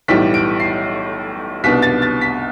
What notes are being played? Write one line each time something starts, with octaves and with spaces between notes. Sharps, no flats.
B1 A2 E3 G3 B6
D7
C7
C2 B2 B3 D4 B6
A6
A6
B6